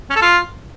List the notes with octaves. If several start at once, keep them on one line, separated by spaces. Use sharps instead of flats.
C#4
A4
F4